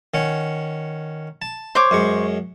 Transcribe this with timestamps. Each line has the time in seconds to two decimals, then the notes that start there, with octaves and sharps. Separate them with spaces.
0.14 D#3 C#4 F#5
1.42 A5
1.75 C5 C#5 D6
1.91 F#2 G#3 C#6